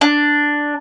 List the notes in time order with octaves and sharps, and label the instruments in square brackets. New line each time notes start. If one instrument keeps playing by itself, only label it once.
[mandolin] D4